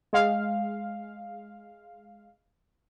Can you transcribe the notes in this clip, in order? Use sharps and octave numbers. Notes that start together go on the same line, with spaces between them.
G#3 F5